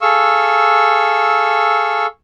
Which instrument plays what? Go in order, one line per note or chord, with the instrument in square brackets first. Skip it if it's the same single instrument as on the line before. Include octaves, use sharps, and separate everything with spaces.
[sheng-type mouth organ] G#4 A4 F5 C#6 E6